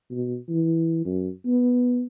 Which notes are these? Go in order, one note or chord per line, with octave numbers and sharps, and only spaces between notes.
B2
E3
F#2
B3